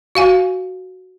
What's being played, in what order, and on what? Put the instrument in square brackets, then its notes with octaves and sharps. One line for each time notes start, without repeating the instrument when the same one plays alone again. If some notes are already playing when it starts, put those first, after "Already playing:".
[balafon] F#4 F5 G#5